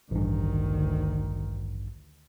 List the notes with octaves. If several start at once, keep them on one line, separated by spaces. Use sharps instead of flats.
A1 D2 G2 D#3